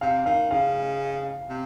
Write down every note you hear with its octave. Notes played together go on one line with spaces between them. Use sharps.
C3 F5
D#3 F5
C#3 F5
C3